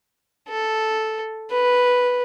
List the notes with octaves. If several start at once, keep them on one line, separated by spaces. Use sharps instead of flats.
A4
B4